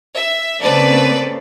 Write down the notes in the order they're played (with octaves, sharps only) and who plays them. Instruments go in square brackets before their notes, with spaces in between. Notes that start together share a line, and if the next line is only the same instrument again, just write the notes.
[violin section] E5
[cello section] C#3 A#3 C4 [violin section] A4 B4 D5